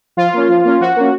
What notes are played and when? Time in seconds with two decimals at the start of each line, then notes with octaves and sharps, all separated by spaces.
0.17 F3 F4
0.33 A#3 C#4
0.49 F3
0.64 A#3 C#4
0.80 F3 F#4
0.96 A#3 C#4